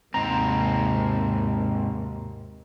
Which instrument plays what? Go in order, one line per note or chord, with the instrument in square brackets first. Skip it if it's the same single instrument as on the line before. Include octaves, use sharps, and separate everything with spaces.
[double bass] D#2 C3 [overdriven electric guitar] G#2 C4 [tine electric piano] A#5